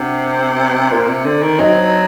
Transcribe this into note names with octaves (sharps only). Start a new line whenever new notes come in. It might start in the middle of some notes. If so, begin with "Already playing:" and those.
Already playing: C3 D4 F#4
A#2
C3
D3
D#3
F#3 C4 D#4